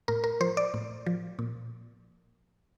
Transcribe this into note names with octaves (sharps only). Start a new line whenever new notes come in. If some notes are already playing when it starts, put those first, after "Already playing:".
A2 A#4
A#4
F3 C5
D5
A2
F3
A#2